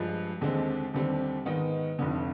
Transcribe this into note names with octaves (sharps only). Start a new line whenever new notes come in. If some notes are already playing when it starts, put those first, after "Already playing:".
Already playing: G2 F3 G#3
D#2 D3 G#3 C4
D#2 D3 G3 C4
G#2 D#3 B3 D#4
F1 F2 D3